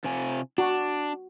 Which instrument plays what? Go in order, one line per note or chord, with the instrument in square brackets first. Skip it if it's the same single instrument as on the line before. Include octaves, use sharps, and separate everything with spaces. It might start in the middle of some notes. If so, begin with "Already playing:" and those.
[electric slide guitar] C3 F4 G#5
[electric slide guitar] D4 [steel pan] F#4